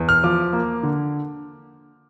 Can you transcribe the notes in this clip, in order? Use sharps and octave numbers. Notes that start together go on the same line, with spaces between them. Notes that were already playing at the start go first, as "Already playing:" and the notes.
Already playing: E2
F6
F3 D6
A#3
D3